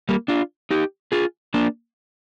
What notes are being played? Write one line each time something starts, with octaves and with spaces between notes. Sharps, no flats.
G3 A#3
D4 F4
D#4 G4
F4 G#4
A#3 D4